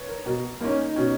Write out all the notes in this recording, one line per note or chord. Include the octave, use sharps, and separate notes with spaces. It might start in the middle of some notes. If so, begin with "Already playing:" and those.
Already playing: B4 C#5
A#4
B2 A#4
A#3 C#4 D#4
D#4
B2 C#4